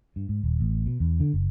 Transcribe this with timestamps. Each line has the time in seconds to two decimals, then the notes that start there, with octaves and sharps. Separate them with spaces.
0.16 G2
0.29 G#2
0.43 D#1
0.60 A1
0.86 B2
1.00 E2
1.20 D3
1.34 F#1